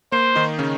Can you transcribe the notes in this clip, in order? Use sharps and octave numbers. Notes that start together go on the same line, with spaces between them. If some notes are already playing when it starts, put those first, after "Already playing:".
A#3 C5
D#3 D#4
C#3 C#4